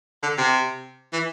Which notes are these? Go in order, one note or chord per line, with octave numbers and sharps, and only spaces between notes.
D3
C3
E3